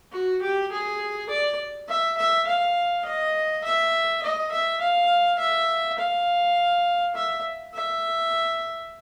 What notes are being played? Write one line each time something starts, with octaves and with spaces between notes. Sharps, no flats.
F#4
G4
G#4
D5
E5
E5
F5
D#5
E5
D#5
E5
F5
E5
F5
E5
E5